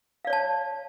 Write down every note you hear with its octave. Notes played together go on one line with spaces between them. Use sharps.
C#5 D5 F5 A5